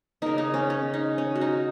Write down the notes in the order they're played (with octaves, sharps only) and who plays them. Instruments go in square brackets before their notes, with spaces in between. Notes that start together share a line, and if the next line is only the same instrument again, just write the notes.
[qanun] C#3 A#3 D#4
D#4
C#4
C#4
D#4
C#4
F#4
D#4